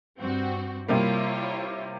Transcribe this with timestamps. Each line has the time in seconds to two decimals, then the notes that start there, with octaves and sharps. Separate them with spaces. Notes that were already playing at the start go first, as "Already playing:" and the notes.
0.20 G2 C4 F#4
0.88 C3 G3 A#3 E4 F4 C#5